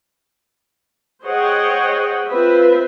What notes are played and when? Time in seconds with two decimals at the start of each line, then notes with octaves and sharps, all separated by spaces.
1.23 G#4 C5 C#5 D#5 F#5 G5
2.27 C4 F4 B4 C5 E5